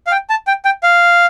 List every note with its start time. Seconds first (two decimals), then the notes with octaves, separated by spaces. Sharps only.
0.07 F5
0.12 G5
0.30 A5
0.47 G5
0.65 G5
0.83 F5